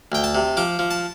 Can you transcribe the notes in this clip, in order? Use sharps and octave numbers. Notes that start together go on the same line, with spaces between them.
D2 G5
A5
C3
F3 D6
F3
A5